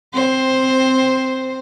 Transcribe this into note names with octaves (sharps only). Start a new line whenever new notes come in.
C4 C5